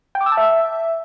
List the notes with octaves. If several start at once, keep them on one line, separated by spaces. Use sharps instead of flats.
G5
D6
E6
A5
E5